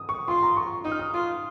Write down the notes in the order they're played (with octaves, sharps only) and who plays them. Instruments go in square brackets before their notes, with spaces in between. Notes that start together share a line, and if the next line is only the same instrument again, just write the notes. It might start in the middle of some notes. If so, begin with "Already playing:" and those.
Already playing: [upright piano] D#6
C#6
[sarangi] F4 [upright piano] C6
[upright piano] A#5
C#6
[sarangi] D#4 [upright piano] D#6
[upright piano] F6
D#6
[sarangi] F4 [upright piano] D#6